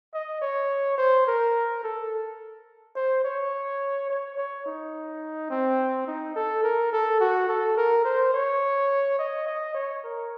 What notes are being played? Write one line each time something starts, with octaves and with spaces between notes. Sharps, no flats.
D#5
C#5
C5
A#4
A4
C5
C#5
C#5
C#5
D#4
C4
D#4
A4
A#4
A4
F#4
A4
A#4
C5
C#5
D#5
D#5
C#5
A#4